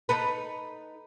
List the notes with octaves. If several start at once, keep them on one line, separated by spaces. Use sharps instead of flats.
D#4 A4 B4